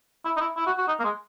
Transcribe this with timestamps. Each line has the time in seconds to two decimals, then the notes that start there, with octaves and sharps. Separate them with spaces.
0.25 E4
0.37 D#4
0.41 E4
0.57 E4
0.67 F#4
0.78 F#4
0.88 D#4
1.00 A#3
1.04 G#3